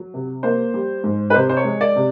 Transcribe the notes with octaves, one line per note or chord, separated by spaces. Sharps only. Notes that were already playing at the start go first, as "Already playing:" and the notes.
Already playing: F#3
C3
A#3 C5
G3
G#2
B4
C3 C5
C5
C#5
G#3
D5
C3